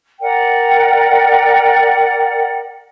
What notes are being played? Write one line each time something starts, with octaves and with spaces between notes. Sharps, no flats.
A#4 D5 F#5 G5